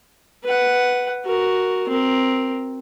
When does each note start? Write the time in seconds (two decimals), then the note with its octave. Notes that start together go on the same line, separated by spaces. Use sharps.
0.44 B4 F#5
1.25 F#4 A#4
1.88 C4 A#4